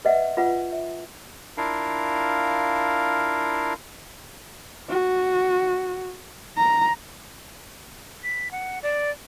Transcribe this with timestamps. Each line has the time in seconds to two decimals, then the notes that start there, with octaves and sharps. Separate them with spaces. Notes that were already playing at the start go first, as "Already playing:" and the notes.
0.05 B4 D#5 E5 F#5
0.37 F4 B4 F#5
0.73 E5
1.57 D4 E4 F4 A#4 F5
4.89 F#4
6.57 A#5
8.23 B6
8.51 F#5
8.83 D5